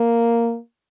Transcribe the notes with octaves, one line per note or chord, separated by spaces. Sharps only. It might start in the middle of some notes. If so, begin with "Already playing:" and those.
Already playing: A#3